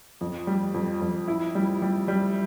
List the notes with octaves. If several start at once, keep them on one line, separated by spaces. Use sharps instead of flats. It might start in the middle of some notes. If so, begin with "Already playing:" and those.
F2
G3
F2
F2
E4
G3
G3
G3